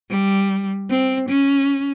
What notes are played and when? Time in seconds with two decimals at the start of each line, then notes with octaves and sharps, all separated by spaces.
0.11 G3
0.90 C4
1.29 C#4